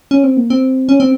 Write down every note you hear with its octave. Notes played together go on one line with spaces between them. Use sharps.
C#4
C4
A#3
C4
C#4
C4